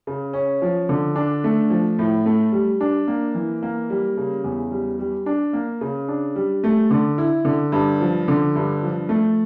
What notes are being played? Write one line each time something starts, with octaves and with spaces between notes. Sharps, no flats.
C#3
C#4
F3
D3
D4
A3
F3
A2
A3
G3
D4
A#3
E3
A#3
G3
C#3
E2
G3
G3
D4
A#3
C#3
D4
G3
A3
D3
E4
D3
G2
F3
D3
G2
F3
A3